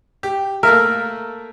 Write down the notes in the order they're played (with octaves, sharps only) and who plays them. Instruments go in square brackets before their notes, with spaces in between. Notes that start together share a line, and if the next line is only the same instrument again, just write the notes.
[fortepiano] G4
[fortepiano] A3 A#3 E5 [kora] A#4